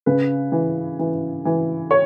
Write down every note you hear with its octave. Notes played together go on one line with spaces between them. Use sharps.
C#3 B4
E3
E3
E3
C#5